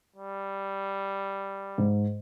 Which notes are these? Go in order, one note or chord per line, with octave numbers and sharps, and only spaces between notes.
G3
G#2